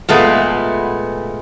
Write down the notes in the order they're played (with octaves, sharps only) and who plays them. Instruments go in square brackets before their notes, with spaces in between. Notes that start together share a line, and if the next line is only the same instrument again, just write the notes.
[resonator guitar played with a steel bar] A#2 G#3 A3 B3